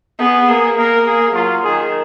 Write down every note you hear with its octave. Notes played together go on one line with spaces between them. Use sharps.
B3 G#4
A#3 G#4
A#3 A#4
G#4
F#3 F4
D#3 G#4